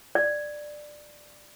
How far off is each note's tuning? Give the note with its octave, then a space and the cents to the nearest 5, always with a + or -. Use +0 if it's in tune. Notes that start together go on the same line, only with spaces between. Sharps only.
D5 +10